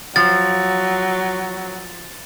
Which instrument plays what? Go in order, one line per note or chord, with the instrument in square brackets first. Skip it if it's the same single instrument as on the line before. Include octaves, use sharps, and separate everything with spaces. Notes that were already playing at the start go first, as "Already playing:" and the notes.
[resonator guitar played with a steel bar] F3 [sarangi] F#3 [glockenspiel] A6